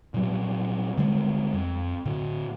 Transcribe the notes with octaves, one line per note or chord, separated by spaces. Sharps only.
A#2 F#3 G3
D3 G3 G#3
F2
A2 D3